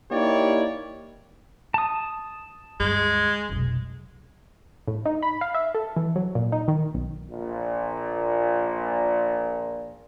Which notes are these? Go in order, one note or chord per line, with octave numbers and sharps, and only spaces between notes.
A#3 D#4 E4 G4 C#5 D5
A5 D#6
D2 G2 G#3
F1 B1
A2
D#4
B5
F5
E5
A4
E3
F#3
A#2
D#4
D#3
B1
A#1 A#2